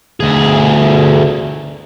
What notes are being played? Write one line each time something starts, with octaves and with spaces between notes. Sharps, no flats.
D2 G#4